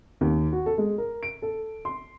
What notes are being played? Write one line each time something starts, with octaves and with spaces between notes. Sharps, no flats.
D#2
F#4
A4
G#3
A#4
D7
A4
C6